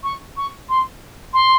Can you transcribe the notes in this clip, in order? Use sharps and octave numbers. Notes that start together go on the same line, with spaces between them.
C#6
C#6
C6
C6